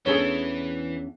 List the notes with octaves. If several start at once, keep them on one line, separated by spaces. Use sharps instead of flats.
E2 E3 C#4 D4 G#4 A4 C#5